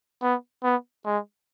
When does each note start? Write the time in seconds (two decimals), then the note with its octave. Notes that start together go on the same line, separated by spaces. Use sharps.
0.22 B3
0.64 B3
1.05 G#3